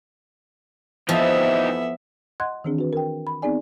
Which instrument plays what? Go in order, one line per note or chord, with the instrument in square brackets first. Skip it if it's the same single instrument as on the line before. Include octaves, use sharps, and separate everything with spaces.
[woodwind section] F2 E3 [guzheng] F3 [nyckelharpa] B3 E5 [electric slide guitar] D#4 G4
[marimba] D#5 F#5 C6 F#6 G#6
D#3 E3 C4 D4 G#4
F#4 B4
A#4 G5
B5
B3 C4 D#4 G#4 D5 G#5